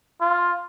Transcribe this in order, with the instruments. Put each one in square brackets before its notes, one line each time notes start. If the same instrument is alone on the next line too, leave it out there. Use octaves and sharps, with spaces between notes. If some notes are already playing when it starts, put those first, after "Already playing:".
[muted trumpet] F4